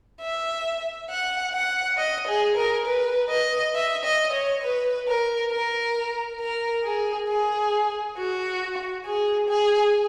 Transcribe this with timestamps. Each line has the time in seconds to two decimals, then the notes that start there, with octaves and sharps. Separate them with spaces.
0.21 E5
1.10 F#5
1.53 F#5
1.97 D#5
2.28 G#4
2.57 A#4
2.86 B4
3.30 D#5
3.75 E5
4.04 D#5
4.33 C#5
4.63 B4
5.08 A#4
5.51 A#4
6.40 A#4
6.84 G#4
7.29 G#4
8.17 F#4
9.06 G#4
9.49 G#4